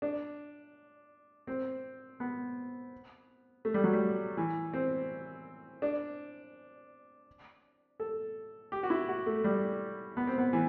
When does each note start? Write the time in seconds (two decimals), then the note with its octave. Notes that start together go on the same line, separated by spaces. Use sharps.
0.02 D4
1.47 C4
2.20 B3
3.65 A3
3.74 G3
3.84 F#3
3.93 G3
4.37 E3
4.73 C4
5.82 D4
8.00 A4
8.72 G4
8.83 F#4
8.90 E4
9.09 F#4
9.26 A3
9.44 G3
10.17 B3
10.27 C4
10.38 B3
10.53 E3